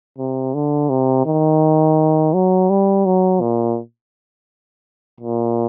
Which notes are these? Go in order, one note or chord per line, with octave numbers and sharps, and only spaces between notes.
C3
D3
C3
D#3
F#3
G3
F#3
A#2
A#2